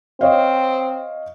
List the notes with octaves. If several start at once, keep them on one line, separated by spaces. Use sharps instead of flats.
C4 C#5 D#5 F5